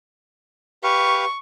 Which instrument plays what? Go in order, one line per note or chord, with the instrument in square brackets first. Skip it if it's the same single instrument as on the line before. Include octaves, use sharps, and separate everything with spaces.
[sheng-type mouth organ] G4 B4 F5 [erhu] C#6